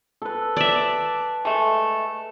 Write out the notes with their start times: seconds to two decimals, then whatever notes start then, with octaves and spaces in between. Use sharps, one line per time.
0.22 A4 B4
0.57 D5 E5
1.45 G#3 A3